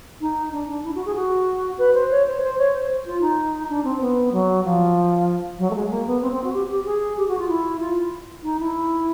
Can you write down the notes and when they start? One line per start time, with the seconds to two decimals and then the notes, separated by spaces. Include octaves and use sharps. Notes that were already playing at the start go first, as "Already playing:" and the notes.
0.21 D#4
0.52 D4
0.68 D4
0.84 E4
0.95 F#4
1.06 G#4
1.15 F#4
1.79 B4
1.94 C5
2.10 C#5
2.26 C5
2.42 C5
2.58 C#5
2.73 C5
3.06 F4
3.21 D#4
3.69 D4
3.84 C4
4.01 B3
4.32 F#3
4.65 F3
5.59 F#3
5.70 A3
5.75 G#3
5.91 A#3
6.07 B3
6.22 C4
6.32 C4
6.44 F#4
6.53 G4
6.70 G4
6.85 G#4
7.17 G4
7.28 F#4
7.39 F4
7.48 E4
7.80 F4
8.43 D#4
8.60 E4